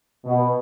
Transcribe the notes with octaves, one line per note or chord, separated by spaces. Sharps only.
B2